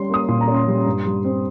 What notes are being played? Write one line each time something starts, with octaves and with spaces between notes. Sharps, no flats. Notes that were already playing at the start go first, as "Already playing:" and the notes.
Already playing: G3 C#4 C6
A#3 D#6
A#2 C6
A#5
C#4
C6
G3
G2
G3
C4